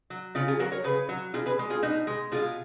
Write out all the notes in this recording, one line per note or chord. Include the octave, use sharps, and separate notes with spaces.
F#3
C#3 C#4 F4
F4 G#4
F#3 F#4 A#4
A#4 C#5
C#3 G#4 B4
F#3
B2 F4 G#4
G#4 B4
G#3
F4 G#4
B2 D#4 F#4
G#3
B2 F4 G#4